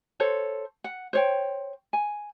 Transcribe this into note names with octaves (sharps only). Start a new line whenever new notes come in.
A4 C5 C#5
F#5
C5 C#5 G5
G#5